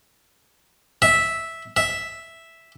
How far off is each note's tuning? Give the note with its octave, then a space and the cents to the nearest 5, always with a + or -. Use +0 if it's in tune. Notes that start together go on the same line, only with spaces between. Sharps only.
E5 -10
E5 -5